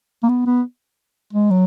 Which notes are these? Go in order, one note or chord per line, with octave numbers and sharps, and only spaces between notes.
A#3
B3
B3
G#3
F#3